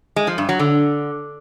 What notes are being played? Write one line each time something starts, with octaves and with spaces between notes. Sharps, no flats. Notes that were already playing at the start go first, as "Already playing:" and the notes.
G#3
F3
G2
F#3
D3